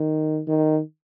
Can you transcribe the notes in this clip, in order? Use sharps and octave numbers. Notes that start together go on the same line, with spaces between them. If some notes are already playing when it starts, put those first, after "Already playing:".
Already playing: D#3
D#3